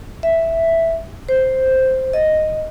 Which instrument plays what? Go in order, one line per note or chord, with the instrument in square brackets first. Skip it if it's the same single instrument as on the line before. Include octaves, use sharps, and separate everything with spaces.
[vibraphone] E5
C5
D#5